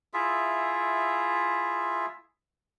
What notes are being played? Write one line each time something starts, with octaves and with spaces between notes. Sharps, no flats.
E4 F4 G#4 E5